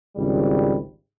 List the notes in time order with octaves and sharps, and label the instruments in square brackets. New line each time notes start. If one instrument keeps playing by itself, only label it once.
[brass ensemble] G#1 C#2 G3